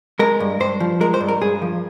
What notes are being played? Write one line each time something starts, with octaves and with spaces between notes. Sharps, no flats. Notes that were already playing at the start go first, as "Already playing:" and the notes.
G#3 A#4
G2
G2 C5
F3
G#3 A#4
C5
G2
A#4
G2 G#4
F3